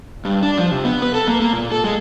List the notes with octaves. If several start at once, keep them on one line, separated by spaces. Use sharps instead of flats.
G2
D4
F3
C3
B3
B4
A4
A#3
A#3
A#2
A4
G#3